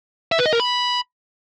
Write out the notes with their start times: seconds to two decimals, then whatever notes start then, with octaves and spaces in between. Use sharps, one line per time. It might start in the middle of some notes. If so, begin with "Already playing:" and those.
0.32 E5
0.39 B4
0.46 D#5
0.53 A#4
0.60 B5